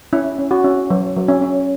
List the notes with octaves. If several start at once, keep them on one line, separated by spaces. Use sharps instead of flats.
C#4 E4
C#4
F#4
C#4
F#3
F#3
C#4
C#4